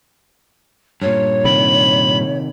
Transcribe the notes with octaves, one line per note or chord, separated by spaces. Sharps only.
G2 A#2 C#5
C3 D#3 B5